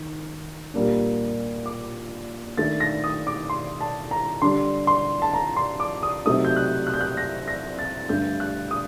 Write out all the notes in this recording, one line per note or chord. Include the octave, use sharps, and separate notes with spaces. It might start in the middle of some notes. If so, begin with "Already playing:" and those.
Already playing: D#3
A#2 G3 A#3 D4
D6
D#3 A3 D4 A6
A#6
D#6
D6
C6
A5
A#5
D3 G3 D4 C6
C6
A5
A#5
C6
D6
D#6
C3 F#3 A3 D#4 D#6
G6
F#6
F#6
G6
F#6
A#6
A#6
A6
G2 D3 A3 G6
F#6
D#6